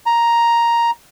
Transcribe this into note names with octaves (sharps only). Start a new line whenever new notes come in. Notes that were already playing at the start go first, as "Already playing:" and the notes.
A#5